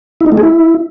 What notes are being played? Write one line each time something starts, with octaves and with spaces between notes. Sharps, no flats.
E4
D#4
A3
G#4
E4